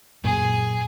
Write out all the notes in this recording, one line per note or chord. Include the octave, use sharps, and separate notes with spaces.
F#2 A#2 G#4